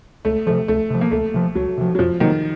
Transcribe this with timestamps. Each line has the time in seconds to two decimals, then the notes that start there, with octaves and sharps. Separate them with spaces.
0.25 C#2 A3
0.47 C3 F3 A3
0.68 C#2 A3
0.90 C3 F3
1.01 A#3
1.11 C#2 A3
1.34 C3 F3
1.55 C#2 F#3
1.78 C3 F3
1.95 F#3
1.99 F2 F3
2.20 C3 D#3 F#3 A#3